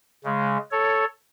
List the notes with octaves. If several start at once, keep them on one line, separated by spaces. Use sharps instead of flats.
C#3 G#3
A4 C#5